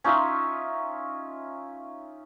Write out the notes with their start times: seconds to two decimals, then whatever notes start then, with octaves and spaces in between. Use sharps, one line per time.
0.04 C#4 D#4 F4 E5